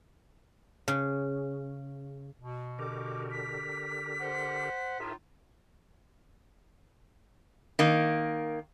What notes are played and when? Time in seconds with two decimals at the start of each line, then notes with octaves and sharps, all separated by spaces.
0.88 C#3
2.40 B2
2.79 D3 G4 A#4 D6
3.31 B6
4.20 C5 F#5
5.00 A2 D#4 F4 G#4 A#4 E5
7.79 D#3 A#3